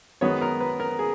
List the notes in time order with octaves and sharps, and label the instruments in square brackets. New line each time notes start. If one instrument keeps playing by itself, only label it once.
[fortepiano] F#2 D#3 G#3 B3 C#5
A#4
B4
A#4
G#4